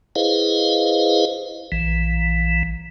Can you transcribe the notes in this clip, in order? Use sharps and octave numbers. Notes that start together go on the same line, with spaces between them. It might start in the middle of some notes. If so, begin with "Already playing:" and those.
E4 G#4 B4 C5 D#5 F5
A#1 E3